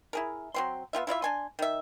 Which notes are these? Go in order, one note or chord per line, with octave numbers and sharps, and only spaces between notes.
E4 G#4 A#4
F#3 C4 C6
B3 C4 F4 E5
E4 F4 D5 E5
D4 G#5 C6
D#3 E5